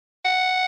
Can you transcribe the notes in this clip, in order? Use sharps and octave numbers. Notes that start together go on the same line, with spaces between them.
F#5